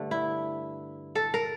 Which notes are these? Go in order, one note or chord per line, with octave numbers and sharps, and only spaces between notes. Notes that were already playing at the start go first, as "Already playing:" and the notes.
Already playing: G2 D3 A3
E4
A4
A#4